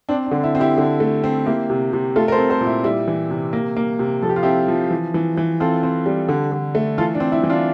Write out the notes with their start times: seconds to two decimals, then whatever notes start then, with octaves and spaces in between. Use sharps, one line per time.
0.09 C4 D4
0.26 D4
0.31 D3
0.43 E4
0.55 C4
0.60 E4 G4
0.78 D3
1.00 A3
1.24 C4
1.46 A#3 E4 G4
1.70 C3
1.93 C3
2.16 A3 F4 A4
2.28 A#4
2.32 A4 C5
2.38 C4
2.50 A4 C5
2.61 A#2
2.67 E4
2.84 G3 E4
3.08 E3
3.31 C3
3.53 A#3
3.76 A#3
3.99 C3
4.22 F3 A4
4.29 G4
4.36 F4
4.43 C4 E4 G4
4.68 F3
4.91 E3
5.14 E3
5.37 E3
5.60 C4 F4 A4
5.83 C4
6.06 G3
6.29 D3
6.52 D3
6.75 A3
6.98 E3 F4 A4
7.15 D4
7.20 C4
7.32 E4
7.43 E3
7.50 D4 F4